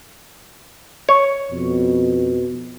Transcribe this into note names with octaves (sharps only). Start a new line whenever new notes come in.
C#5
F2 B2